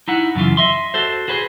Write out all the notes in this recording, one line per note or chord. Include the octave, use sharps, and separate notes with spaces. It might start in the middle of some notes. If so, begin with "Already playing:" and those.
D#4 E4 F#5
F#2 C#3 E3 F4
D#5 E5 C6
F#4 A4 C5
F#4 G#4 B4 C5